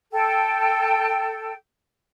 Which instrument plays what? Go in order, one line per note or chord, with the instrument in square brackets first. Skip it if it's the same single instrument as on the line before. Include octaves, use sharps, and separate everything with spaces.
[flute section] A4 G5